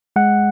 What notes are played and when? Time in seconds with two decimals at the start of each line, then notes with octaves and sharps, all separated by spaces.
0.16 G#3 F#5